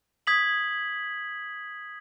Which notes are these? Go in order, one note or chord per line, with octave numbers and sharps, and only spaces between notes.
D#6 G#6 B6 F#7